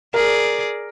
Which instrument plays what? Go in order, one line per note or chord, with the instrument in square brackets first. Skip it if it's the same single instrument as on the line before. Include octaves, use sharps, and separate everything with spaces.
[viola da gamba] G#4 D5 [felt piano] A#4